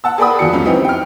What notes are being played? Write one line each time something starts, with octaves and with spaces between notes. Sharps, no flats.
F#5 A5 E6
G#4 A#4 D5 G5 B5 D#6
E2 F3 F#4 C#7
C2 F2 C#4
B3 C4 D#4 E4 G4
G5 F6